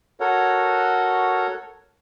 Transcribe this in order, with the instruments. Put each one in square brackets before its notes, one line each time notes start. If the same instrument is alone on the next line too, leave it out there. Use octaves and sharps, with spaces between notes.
[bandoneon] F#4 A4 A#4 C#5 F#5